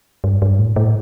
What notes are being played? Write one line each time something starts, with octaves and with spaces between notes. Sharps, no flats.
G2
G2
A2
A2